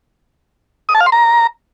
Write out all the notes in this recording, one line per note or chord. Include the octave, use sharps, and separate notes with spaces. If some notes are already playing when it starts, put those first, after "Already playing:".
D#6
A5
F5
C6
A#5